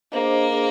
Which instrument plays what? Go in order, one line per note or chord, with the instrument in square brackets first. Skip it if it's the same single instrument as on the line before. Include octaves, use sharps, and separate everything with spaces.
[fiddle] A#3 [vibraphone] D4 G#4 C5 D#5
[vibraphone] D4 G#4 C5 D#5